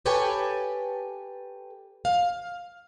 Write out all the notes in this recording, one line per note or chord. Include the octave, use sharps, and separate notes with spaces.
G4 A4 B4 C#5 G5 G#5
F5